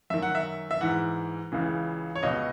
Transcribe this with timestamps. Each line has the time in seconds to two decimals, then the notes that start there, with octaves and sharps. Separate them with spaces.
0.10 F#2 D#3 E5
0.22 F#5
0.35 E5
0.71 E5
0.81 G#2 E3 F#5
1.52 C#2 C#3 E3
2.15 C#5
2.23 C#2 B2 D#5